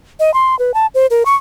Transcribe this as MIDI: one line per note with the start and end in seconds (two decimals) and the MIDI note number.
0.19 0.33 75
0.34 0.58 84
0.59 0.74 71
0.74 0.86 81
0.94 1.06 72
1.10 1.23 70
1.25 1.35 85